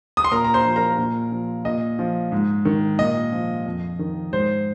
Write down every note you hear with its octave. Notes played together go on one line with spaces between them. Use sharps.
D#6
C6
A#2 A#4 A#5
A#5
C5 C6
F3
A#4 A#5
A#2
F3
A#2 D#5
F3
G#2
D#3
A#2 D#5
F3
F2
D#3
G#2 C5